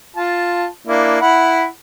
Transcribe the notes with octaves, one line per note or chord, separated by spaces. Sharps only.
F4 A5
A#3 D4 E4
E4 F#5 B5